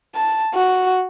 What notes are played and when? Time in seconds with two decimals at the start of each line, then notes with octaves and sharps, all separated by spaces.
0.15 A5
0.54 F#4